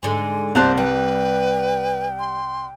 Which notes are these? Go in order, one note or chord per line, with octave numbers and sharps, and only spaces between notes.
G#2 D3 G#3 G#5
C2 A#3 C4 D4 C5 A5 F#6
G3 B4 G5
C6